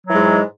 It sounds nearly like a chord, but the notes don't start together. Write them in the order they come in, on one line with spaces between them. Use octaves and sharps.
F#3 E3 G#3 G#2